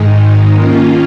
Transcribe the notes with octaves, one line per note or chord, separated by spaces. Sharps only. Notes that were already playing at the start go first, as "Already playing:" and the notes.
Already playing: G#2 D#3 G#3 D#4
D#3 A#3 C#4 F4